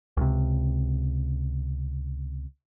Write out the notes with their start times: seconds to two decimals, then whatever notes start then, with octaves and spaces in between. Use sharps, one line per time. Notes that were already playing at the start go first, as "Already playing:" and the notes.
0.17 C#2 C3